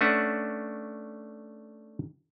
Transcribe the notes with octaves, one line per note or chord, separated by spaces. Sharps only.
A3 C#4 D4 B4 E5 F#5